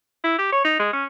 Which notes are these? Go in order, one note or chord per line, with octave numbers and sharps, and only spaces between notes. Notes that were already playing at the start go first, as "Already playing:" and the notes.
E4
G4
C#5
D#4
G#3
C#4